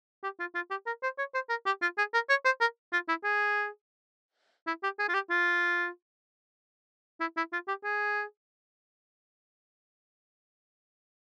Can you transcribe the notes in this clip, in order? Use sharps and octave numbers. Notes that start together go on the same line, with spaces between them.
G4
F4
F4
G4
A#4
C5
C#5
C5
A#4
G4
F4
G#4
A#4
C#5
C5
A#4
F4
E4
G#4
E4
G4
G#4
F4
G4
F4
E4
E4
F4
G4
G#4